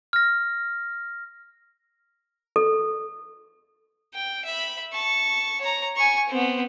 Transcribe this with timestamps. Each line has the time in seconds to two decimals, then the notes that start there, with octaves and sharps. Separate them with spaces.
0.13 F6 A#6
2.56 A4
4.14 G5
4.45 E5 B5
4.93 A5 C#6
5.61 C#5 A#5
5.96 G#5 C#6
6.29 B3 C4